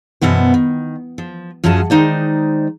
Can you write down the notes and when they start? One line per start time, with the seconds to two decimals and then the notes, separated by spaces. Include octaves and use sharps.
0.21 F#2 B2 E3 B3 C5
0.54 D#3
1.18 F3
1.64 F#2 F3 C#4 F#4 G#4 A5
1.90 D#3 G#3 D#4 C5 D5